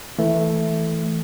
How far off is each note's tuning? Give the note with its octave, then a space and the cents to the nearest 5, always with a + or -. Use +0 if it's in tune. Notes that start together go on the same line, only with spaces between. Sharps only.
E3 -5 A3 +0